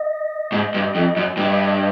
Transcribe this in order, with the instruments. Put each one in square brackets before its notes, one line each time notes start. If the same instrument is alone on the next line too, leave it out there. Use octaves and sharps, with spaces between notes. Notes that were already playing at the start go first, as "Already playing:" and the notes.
Already playing: [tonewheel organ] D#5
[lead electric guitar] G#2
G2
F2
F#2
[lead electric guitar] G2 [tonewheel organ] D#5